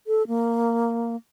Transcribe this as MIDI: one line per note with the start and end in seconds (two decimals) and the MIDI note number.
0.07 0.26 69
0.27 1.16 58